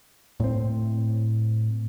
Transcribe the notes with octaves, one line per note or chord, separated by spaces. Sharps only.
A2 C4